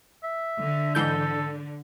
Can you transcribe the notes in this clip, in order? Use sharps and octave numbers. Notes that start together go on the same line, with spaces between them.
E5
D3
G#2 E3 A4 G6